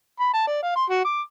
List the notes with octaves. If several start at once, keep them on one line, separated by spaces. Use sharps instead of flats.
B5
A5
D5
F5
C6
F#4
D6